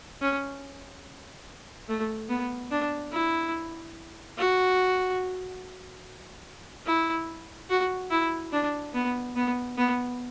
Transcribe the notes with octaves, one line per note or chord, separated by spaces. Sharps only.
C#4
A3
B3
D4
E4
F#4
E4
F#4
E4
D4
B3
B3
B3